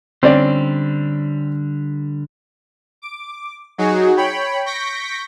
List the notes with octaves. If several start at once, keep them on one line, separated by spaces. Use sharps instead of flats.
D3 G3 C4 C#4 D5
D6
F#3 D#4 F#4 G#4
C#5 G5 B5
C#6 G6 A#6 B6 D7